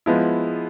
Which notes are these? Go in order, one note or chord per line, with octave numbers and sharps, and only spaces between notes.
F3 G#3 B3 E4